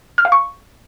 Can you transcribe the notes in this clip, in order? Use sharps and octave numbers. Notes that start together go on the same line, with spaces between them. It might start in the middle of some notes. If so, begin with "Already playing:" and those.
F6
F5
C#6